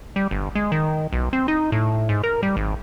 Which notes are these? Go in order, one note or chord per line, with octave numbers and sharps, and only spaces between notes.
G3
G1
G#3
D#3
B1
C4
D#4
A2
G#2
A#4
G3
G#1